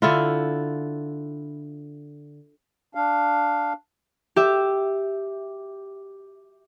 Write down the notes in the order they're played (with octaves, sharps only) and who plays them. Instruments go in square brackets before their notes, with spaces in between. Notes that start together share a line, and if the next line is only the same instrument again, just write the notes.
[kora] D3 E4 F4
[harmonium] D4 F5
[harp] G4 E5